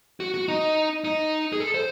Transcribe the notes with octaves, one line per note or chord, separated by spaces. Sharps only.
F#4
F#4
D#4
D#4
G#4
A4
C5